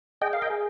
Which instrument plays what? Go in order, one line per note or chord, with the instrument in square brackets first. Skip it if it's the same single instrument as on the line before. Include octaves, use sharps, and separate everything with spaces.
[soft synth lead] G#4 [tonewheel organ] D#5 G5
[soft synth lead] A#4 [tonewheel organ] F5
[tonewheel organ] D#5 G5
[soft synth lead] G#4